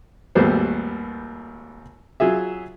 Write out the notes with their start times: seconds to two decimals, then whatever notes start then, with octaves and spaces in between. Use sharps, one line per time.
0.35 G#1 D#2 G3 A3 B3 C5
2.20 F#3 F4 G#4 E5